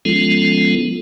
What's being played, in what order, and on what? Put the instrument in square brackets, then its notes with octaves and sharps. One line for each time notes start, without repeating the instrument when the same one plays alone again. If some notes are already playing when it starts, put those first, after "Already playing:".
[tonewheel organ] F3 G#3 B3 C#4 F4 A4